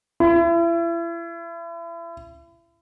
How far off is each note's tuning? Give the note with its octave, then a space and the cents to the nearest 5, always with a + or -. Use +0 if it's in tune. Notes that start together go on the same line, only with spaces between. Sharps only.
E4 +35